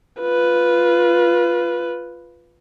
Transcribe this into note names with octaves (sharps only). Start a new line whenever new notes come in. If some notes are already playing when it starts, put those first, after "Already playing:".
F4 B4